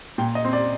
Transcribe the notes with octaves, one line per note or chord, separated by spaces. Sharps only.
A#2 G5
D#5
C4
D5